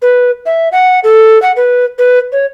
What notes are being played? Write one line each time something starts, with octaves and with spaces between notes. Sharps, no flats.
B4
E5
F#5
A4
F#5
B4
B4
C#5